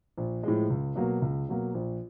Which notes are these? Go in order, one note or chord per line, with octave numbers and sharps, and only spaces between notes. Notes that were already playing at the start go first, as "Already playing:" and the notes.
A#1
A2 F3 G#3
C#2
B2 F#3 A#3
C#2
B2 F#3 A#3
A#1